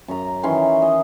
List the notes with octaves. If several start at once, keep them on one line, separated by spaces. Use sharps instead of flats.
F#2 A#5
D#3 E3 C#4 C6
D#5